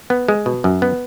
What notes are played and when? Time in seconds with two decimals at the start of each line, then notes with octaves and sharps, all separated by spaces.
0.10 B3
0.28 G#3
0.46 B2
0.64 F#2
0.82 B3